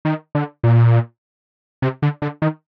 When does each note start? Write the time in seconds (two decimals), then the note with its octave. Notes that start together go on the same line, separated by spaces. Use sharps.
0.05 D#3
0.35 D3
0.64 A#2
1.82 C3
2.02 D3
2.22 D3
2.42 D#3